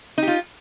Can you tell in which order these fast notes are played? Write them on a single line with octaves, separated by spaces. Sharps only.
D#4 G4 F4